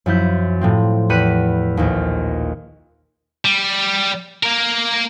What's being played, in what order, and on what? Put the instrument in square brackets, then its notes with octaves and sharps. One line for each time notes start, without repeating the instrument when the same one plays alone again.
[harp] F#2 F3 E4 G6
A2 F3 C4
E2 G4 B5 F#6 C#7 D#7
A#1 D#2
[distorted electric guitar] G3
A#3 A#4